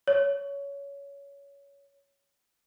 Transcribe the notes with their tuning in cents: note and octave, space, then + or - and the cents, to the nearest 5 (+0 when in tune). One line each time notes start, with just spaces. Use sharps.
C#5 +20